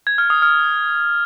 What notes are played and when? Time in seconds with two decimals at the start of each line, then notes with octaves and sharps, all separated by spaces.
0.07 G#6
0.18 F6
0.30 D#6
0.42 F6